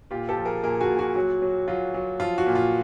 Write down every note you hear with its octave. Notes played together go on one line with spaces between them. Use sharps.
A#2 F4 G4
G4 A4
F3
G#4 A#4
A#2 G#4 A#4
F#4 G#4
A#2
F#4
F#3 F#4
F#3
F#3 F4
F#3
F3 F4
F#4
A#2
F4